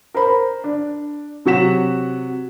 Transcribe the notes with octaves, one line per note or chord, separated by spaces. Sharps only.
A#4 C5 B5
D4
C3 F#3 F#4 F#5 B6 E7